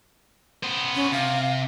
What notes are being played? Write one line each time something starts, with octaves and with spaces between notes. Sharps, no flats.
B3 C5
C#4
C3 F5